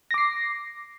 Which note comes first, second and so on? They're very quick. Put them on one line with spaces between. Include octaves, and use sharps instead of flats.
A#6 D6 C7